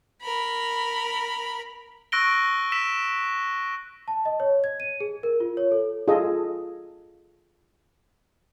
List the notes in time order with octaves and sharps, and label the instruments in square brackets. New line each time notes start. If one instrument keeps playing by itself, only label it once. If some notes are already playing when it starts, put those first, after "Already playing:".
[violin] A#4 B5
[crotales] C#6 E6 F#6 A#6 D7 G7
E6 B6 E7
[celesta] A5
D#5
C#5
G#6
D#7
G#4
A#4
F4
C#5
A4
[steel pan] F4 G#4 A4 D#5